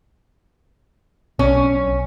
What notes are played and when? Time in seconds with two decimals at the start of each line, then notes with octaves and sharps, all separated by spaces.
1.39 B1 C#4